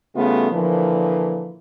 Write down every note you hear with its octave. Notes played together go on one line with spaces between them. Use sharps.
C#3 G3 A3 B3 E4 F4
A#2 D3 E3 F3